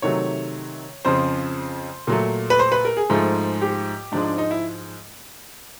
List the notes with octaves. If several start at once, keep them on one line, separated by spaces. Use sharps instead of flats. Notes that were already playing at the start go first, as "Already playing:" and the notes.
C3 D#3 F#3 A3 C#5
F2 C#3 F3 C5
A#2 F#3 A3
B4
C5
B4
A#4
G#4
G#2 F3 A3
G4
G#2 F3 G#3 D4
D4
D#4
E4